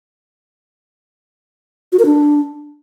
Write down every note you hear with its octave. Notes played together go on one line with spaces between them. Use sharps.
F#4
A#4
D4